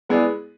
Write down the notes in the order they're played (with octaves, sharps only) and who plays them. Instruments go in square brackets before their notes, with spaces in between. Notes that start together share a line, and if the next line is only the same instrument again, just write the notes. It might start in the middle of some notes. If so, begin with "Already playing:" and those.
[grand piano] G#3 B3 E4 G#4 D5